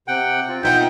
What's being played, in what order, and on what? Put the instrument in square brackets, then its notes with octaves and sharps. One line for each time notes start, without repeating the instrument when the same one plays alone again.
[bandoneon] C3 F#5 G5
C4 F4
[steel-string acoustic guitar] B2 F4 F#5 [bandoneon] D#4 E5 [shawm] G5